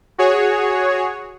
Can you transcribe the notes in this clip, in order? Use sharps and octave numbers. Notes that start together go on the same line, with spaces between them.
F#4 G#4 C#5